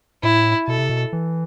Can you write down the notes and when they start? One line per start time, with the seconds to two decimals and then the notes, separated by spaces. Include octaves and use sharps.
0.23 A2 E4
0.67 B2 A4
0.78 C3
0.89 B2
1.13 E3